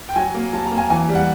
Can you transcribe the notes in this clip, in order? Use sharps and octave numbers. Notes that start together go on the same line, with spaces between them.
G5
F#3 G#5
A#3
F#3 A5
A#5
A#3
G#5
E3 G#5
G3
F#5